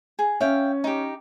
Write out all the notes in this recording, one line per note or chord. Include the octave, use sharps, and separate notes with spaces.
G#4
C#4 E5 F5 G5
D#4 G4